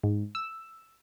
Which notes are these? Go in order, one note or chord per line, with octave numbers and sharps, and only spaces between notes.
G#2
E6